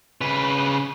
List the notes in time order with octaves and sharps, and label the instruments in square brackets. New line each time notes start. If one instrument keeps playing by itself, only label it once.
[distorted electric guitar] C#3 B4